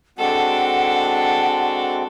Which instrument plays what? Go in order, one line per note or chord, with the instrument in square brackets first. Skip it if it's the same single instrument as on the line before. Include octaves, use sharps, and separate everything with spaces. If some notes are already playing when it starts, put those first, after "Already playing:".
[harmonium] G#3 C4 F#4 [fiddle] D4 A4 [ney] F#5